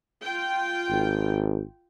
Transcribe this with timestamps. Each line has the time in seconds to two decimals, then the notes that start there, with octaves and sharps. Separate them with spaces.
0.24 F4 G5
0.90 G#1